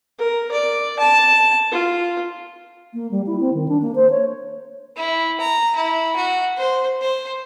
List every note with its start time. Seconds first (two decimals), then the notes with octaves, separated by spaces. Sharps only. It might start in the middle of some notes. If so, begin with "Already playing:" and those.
0.18 A#4
0.51 D5
0.99 A5
1.71 F4
2.93 A#3
3.11 G3
3.27 E4
3.40 C4
3.54 D#3
3.68 D4
3.82 A#3
3.95 C5
4.10 C#5
4.96 E4
5.40 A#5
5.76 E4
6.16 F#4
6.57 C5
7.01 C5